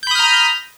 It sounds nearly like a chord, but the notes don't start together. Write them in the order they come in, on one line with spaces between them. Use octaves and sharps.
G6 B5 D#6 F6 A#5